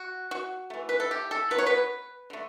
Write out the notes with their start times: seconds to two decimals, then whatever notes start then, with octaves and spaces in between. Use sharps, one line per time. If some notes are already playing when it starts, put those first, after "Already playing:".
Already playing: F#4
0.31 F#4
0.70 E3 A3
0.89 B4
1.00 A4
1.11 G4
1.31 A4
1.50 B2 F#3 B3 B4
1.58 C#5
1.66 B4
2.30 D3 A3